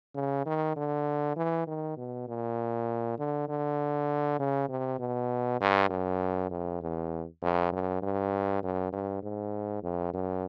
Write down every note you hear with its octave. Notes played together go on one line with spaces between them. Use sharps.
C#3
D#3
D3
E3
D#3
B2
A#2
D3
D3
C#3
C3
B2
G2
F#2
F2
E2
F2
F#2
G2
F#2
G2
G#2
F2
F#2